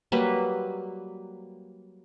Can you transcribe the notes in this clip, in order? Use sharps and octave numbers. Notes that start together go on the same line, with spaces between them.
F#3 G3 A#3 B4